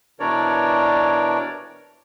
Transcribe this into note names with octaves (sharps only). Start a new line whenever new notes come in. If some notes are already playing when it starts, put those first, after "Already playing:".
B2 E3 D4 A#4 C#5 D5